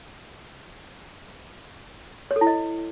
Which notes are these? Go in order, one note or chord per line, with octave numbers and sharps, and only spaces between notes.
C#5
A4
E4
D#5